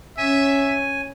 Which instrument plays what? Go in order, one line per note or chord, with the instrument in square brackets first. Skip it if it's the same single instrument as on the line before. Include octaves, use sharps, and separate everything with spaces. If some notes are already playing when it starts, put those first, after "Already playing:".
[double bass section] C#4 [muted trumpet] E5 [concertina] G#5